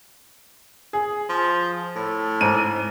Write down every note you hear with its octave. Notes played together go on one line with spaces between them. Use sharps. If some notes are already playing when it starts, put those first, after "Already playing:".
G#4
F3
A2
G#2 D#7